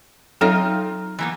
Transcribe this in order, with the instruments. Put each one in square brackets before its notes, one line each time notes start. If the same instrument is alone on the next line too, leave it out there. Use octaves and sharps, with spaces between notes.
[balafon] F#3 A4 C#5 [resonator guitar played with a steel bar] C4 D#4 F4
[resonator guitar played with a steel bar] E3 A#3 B3